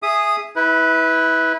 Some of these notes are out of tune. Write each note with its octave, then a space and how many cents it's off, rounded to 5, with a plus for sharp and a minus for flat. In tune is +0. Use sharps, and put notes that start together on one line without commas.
G#4 +0 E5 +0 D#6 -10
E4 -25 B4 +0